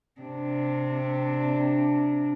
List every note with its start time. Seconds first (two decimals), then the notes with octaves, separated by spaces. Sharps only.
0.21 C3 D4